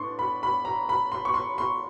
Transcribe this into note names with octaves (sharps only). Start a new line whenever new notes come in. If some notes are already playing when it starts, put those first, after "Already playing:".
Already playing: A2 B3 D4 C6 C#6
B5
B5
A#5
B5
C6
C#6
C6
C6